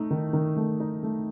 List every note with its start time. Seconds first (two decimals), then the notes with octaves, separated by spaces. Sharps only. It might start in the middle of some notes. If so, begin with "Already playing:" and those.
Already playing: A3 D#4
0.11 D#3
0.33 D#3
0.56 A3
0.80 D#4
1.03 A3